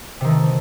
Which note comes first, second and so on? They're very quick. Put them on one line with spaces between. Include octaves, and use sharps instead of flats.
C3 D#3 A3